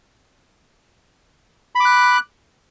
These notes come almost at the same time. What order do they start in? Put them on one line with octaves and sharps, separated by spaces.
B5 D6 F#6